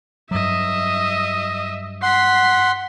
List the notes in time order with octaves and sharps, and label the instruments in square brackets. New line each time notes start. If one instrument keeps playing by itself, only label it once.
[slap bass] G2 F#3 [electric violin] D#5 E5
[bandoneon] F#5 C6 [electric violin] B6 C7